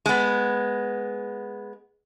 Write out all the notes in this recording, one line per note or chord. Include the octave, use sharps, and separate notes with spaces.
G#3 B3